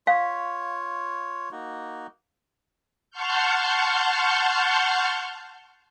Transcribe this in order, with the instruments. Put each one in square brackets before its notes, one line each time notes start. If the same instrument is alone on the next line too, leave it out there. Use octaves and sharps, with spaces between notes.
[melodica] F4 C#5 [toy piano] F5
[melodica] A#3 D#4 F#4
[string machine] F#5 A5 C6 C#6 F6 G6